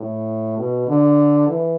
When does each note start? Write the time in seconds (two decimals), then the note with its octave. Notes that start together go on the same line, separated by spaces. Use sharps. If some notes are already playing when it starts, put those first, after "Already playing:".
Already playing: A2
0.58 B2
0.88 D3
1.48 E3